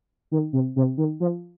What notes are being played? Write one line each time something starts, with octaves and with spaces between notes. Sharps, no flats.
D#3
C3
C3
D#3
F3